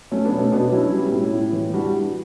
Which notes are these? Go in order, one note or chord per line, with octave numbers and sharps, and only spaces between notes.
F#3 A3 C#4
B3 D4
B2
A3 C#4
B2 B3 D4
F#3 C#4 E4
G3
A2
A2
E3
G3 D4 F#4